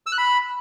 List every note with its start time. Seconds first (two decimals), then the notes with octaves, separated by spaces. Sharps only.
0.06 E6
0.12 F#6
0.18 B5